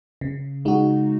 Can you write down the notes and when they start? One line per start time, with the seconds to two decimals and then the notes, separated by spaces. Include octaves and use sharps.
0.21 C#3
0.65 G#3 D#4 F#4